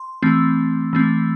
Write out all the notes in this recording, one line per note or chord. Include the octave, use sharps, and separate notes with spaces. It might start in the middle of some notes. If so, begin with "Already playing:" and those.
Already playing: C6
E3 A3 C4
E3 A3 C4